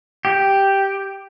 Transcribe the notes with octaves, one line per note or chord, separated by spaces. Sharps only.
G4